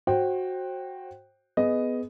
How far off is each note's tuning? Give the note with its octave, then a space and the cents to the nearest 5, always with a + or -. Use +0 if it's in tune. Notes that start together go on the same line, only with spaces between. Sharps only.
F#4 +0 C5 +30 G5 +0
B3 +15 G#4 +15 D#5 +0